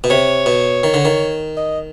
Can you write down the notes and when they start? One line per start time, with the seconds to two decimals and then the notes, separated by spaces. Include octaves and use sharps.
0.04 B2
0.10 C3 C#5
0.46 B2
0.83 D#3
0.94 D3
1.05 D#3
1.57 D#5